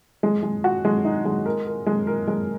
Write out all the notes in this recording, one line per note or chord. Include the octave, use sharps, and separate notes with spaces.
G#3
G#3
F#4
G#3
D#4
G#3
A#4
A#4
G#3
A#4
G#3